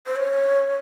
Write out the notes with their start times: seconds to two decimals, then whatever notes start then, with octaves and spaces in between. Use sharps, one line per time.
0.06 C5
0.16 C#5